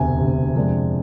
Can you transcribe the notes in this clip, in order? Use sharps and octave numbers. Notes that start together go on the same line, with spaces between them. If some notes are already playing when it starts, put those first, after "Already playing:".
Already playing: E1 D2 C3 G#5
E1 D2 C3
F2 C3 G#3 D4